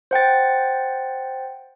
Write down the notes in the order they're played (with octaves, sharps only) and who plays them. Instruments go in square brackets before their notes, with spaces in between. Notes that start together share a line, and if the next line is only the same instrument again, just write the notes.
[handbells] C5 F#5 G5 A6